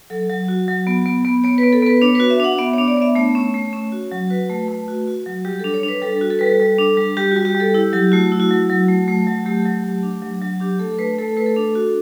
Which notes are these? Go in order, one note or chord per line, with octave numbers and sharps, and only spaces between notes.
F#3 A4
F#3
F#4
F#3
B3
B3
B3
B3 C#5
B4
B3
A4
B3 B4
D4 C#5
F#4 B4
E5
D4 F#5
B3 E5
D4 C#5
D5
B3 E5
A3 C#5
C#4
A3
C#4
F#4
F#3
F#4 B4
A3
A3
F#4
F#4
F#3
G3 G4
D4 A4
C#5
D4
B4
G3 A4
F#4
A4
G3 B4
A4
G3
D4
G3
G3 G4
G3 F#4
G4
G3
A4
E4 G4
F#3 G4
A3 F#4
E4
F#4
F#3
F#3
A3
A3
F#3
A3 G4
F#3
A3
D4
F#3
F#3
D4 G4
A3 A4
A3 B4
A3 A4
A3 B4
A4
D4
F#4